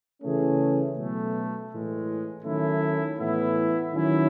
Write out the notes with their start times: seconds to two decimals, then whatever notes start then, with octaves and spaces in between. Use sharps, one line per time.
0.22 C#3 E3 A3 C#4 G#4
0.96 B2 F#3 A3
1.71 A2 E3 G#3
2.44 D#3 F#3 A3 C#4 E4
3.18 A2 E3 B3 E4
3.92 D#3 F#3 C#4 E4